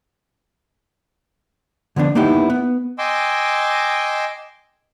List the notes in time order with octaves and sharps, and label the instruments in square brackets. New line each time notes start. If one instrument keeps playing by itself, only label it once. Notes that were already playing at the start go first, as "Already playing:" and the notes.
[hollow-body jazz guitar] D3 F3 B3 D4
A#3 B3 D#4 E4 G4
B3
[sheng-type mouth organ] D#5 G5 G#5 C6 D6 E6